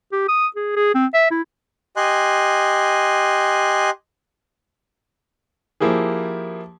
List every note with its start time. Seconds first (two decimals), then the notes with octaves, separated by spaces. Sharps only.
0.12 G4
0.29 D#6
0.56 G#4
0.76 G#4
0.94 C4
1.14 E5
1.31 E4
1.97 G4 D#5 G#5 C6 F#6
5.80 F3 A#3 E4 G4 G#4